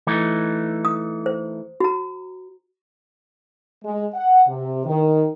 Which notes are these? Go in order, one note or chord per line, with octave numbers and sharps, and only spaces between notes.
E3 A3 D#4
D#6
C5
F#4 A#5
G#3
F#5
C3
D#3